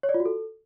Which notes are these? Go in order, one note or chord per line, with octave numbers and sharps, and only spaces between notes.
C#5
D5
F4
F#4
A4